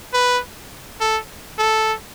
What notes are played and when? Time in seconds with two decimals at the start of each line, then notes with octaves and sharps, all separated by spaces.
0.13 B4
1.01 A4
1.58 A4